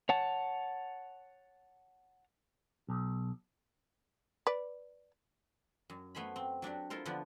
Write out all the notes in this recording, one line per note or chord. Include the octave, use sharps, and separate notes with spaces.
C#5 F#5 A5
B1
B4 D5
F#2
A3 B3 C5 G#5 B5
C4
F#3 D4 F#4 G4
E4 F4 A4 A#4 C5
D3 F3 B3 D4 B4